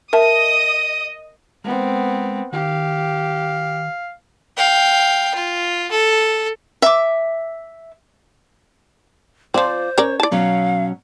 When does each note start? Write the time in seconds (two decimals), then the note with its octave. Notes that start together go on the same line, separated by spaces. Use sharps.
0.13 A#4 D#5 E5 A5 D#6
1.64 G#3 B3 C4 A#4
2.52 D#3 G4 F5
4.57 F5 G5
5.35 F4
5.91 A4
6.82 E5 D6
9.54 F3 C4 F4 C5 D5
9.98 C#4 A#4 C#5 D5
10.20 E4 D5 A5
10.31 B2 F#3 C#4 F5